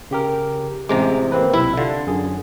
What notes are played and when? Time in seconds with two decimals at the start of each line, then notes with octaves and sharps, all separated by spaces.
0.11 C#3 G4 A#4
0.89 A1 C3 G#3 A#5 D6
1.32 A#3 C4 B4
1.54 B1 C3 E4 E5
1.77 D3 D4 F4
2.07 F#2 G#4